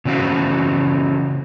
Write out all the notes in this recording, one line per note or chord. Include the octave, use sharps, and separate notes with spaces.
C#3 E3 C4 F#4 E5 F5